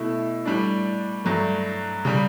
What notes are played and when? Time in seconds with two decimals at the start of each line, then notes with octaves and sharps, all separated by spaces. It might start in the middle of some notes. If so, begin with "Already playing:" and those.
Already playing: B2 A3 E4
0.45 A2 G3 D4
1.25 G2 F#3 A3
2.05 C#3 G3